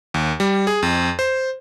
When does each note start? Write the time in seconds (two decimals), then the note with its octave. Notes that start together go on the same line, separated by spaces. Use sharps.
0.14 D#2
0.40 G3
0.67 G#4
0.82 F2
1.19 C5